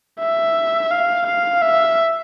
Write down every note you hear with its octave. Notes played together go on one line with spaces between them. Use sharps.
E5
F5
F5
E5